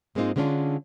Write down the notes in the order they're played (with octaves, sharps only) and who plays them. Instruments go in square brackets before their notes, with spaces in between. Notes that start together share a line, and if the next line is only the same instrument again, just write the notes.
[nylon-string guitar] G#2 G#3 A#3 C4 D#4 F4
D3 G#3 B3 C#4 D4 F4